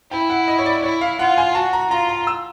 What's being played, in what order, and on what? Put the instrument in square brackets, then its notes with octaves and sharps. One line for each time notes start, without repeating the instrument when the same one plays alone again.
[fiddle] E4 [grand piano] G5
[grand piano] F#5
D#5
C#5
D5
[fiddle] E4 [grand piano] C#5
[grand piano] F5
[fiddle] F4 [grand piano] F#5
[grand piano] G#5
[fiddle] F#4 [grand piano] A5
[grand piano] A#5
[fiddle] F4 [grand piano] A#5
[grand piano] A#5
E6